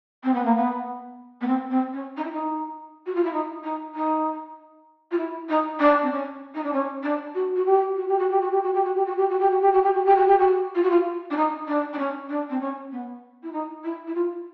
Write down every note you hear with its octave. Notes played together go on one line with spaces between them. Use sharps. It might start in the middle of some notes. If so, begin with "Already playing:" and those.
C4
B3
A#3
B3
B3
C4
C4
C#4
D#4
E4
D#4
F#4
F4
E4
D#4
D#4
D#4
F4
E4
D#4
D4
C4
C#4
D#4
D4
C#4
D4
F#4
F#4
G4
F#4
G4
F#4
G4
F#4
G4
F#4
G4
F#4
G4
F#4
G4
F#4
G4
F#4
G4
F#4
G4
F#4
G4
F#4
G4
F#4
F4
F#4
F4
D4
D#4
D4
D4
C#4
D4
C4
C#4
B3
E4
D#4
E4
E4
F4